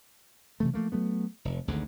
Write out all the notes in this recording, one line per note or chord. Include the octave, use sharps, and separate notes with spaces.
C3 E3 A3
F3 A3 A#3
F#3 A3 B3
F1
G#1 D2 G#2 D3